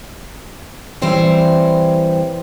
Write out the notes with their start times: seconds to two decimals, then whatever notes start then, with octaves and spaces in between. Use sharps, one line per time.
1.02 E3 G3 C4 C5 C#5 G5